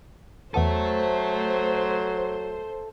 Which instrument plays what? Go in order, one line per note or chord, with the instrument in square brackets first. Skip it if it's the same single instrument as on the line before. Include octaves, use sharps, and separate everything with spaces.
[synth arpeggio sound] E2 B3 D#7 [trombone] F#3 [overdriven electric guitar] A4 E5 [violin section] C5